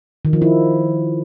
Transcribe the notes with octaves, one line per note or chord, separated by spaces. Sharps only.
D#3
F3
E4